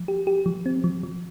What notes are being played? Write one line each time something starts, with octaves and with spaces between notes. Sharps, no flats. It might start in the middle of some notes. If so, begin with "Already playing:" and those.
Already playing: F3
G4
G4
F3
C4
F3
F3